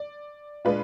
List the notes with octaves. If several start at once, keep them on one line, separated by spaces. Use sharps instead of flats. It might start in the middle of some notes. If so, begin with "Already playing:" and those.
Already playing: D5
A#2 G#3 D4 F4 B4